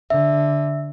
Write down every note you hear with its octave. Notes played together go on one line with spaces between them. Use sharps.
D3 E5